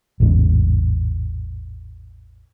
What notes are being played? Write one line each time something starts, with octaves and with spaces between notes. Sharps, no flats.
A1 E2 G#2 C#3